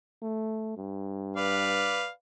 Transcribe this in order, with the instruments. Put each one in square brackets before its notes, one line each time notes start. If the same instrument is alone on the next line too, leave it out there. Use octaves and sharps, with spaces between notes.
[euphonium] A3
G2
[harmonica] B4 D5 F5